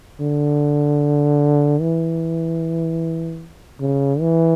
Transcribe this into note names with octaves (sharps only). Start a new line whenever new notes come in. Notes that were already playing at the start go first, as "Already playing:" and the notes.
D3
E3
C#3
E3